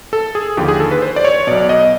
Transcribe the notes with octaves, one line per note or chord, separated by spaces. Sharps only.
A4
G#4
D#2 D3 F3 G4
G#4
A4
B4
C5
D5
C#5
B1 B2 D5
D#5